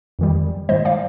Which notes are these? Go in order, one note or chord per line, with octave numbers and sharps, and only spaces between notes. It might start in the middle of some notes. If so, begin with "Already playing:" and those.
F2 D#3 G3
G#2 D#3 G3 C5 D#5
D5 F5